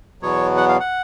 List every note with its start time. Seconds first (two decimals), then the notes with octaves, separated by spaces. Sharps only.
0.22 E2 B2 F#3 B3 C#5
0.57 F#5
0.69 F5
0.80 F#5